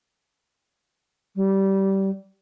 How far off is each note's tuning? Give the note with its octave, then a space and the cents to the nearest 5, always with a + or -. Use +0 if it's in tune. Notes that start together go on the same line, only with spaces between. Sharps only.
G3 -20